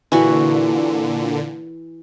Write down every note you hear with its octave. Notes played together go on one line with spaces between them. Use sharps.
A#2 D3 E3 F#4